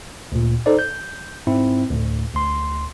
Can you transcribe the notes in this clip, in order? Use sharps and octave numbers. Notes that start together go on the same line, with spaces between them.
D2 A#2
D#4 A4 C5 D5
G6
G#2 C4 E4
D2 A2
D2 C6